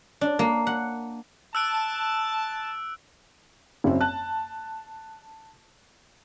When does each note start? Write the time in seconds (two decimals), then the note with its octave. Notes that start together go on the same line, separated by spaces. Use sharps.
0.21 D4
0.39 A#3
0.67 F#5
1.55 A5 E6 F#6 D7
3.84 F#1 F#2 C4
4.01 A5 F#6